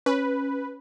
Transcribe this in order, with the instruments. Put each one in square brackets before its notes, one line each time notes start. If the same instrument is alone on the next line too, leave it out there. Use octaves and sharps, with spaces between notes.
[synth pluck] C#4 [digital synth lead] B4